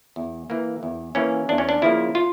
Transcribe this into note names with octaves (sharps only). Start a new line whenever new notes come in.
E2
E3 A#3
E2
E3 A#3 C#4
E2 D4
C#4
D4
C#3 F3 A#3 E4
F4